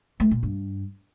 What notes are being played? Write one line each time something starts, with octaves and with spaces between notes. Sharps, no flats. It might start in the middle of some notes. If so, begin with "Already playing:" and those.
A3
A#2
G2